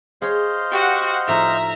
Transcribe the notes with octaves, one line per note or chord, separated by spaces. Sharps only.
G#4 C5 C#5 D#5 F5
F#4 G4 F#5
A2 F3 D#4 E5 A#5